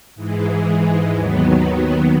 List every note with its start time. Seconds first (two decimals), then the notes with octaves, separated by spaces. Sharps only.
0.15 G#2 E3 G#3
1.12 D#2 D#3 F#3 B3